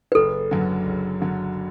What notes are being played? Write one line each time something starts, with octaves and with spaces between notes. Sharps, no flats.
B4
F#1 A4
F#2 D3 F#3
F#1
F#2 D3 F#3